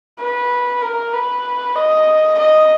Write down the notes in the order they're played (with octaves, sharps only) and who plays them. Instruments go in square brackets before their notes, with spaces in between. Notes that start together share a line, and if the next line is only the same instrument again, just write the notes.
[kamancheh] B4
A#4
B4
D#5
D#5